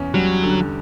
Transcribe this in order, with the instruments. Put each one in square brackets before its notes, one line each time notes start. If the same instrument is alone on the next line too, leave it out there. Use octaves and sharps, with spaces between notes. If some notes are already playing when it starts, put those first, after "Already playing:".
Already playing: [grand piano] E2 C#4
[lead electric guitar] F#3 [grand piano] G3
[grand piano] D3